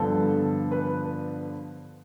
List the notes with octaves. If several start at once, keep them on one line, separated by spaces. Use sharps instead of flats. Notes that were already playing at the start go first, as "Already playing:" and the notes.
Already playing: G2 D3 F3 B3 A4
B4